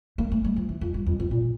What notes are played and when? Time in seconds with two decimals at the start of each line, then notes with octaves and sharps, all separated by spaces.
0.18 A#3
0.32 A3
0.44 G3
0.56 F3
0.69 E3
0.81 F2
0.94 G2
1.06 F2
1.20 F2
1.31 A#2